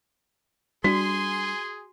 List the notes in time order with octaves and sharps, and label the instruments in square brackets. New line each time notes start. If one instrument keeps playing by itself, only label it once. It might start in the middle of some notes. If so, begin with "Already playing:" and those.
[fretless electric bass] G3 D4 [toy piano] F#4 [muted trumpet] G#4 [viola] G#5 C6